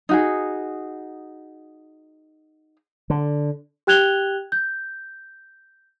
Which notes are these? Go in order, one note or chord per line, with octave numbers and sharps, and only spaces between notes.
D#4 F#4 G#4
D3
G4 G5 F#6 G#6 F7 G7
G6